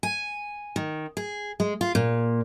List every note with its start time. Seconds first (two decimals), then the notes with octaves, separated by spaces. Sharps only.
0.03 G#5
0.76 D#3
1.17 G#4
1.60 G#3
1.81 F4
1.95 A#2